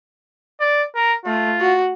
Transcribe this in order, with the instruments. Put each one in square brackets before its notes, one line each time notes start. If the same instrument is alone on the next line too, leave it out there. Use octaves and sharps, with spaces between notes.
[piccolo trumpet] D5
A#4
[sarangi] A3 [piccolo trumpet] F4
[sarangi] F#4